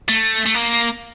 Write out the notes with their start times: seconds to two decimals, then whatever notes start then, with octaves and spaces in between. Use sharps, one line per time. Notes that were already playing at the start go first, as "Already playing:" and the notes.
0.08 A3
0.46 A3
0.54 A#3